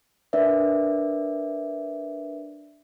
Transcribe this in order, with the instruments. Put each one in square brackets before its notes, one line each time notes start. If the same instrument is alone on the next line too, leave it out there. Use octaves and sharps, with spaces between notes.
[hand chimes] D4 A#4 B4 D5 E5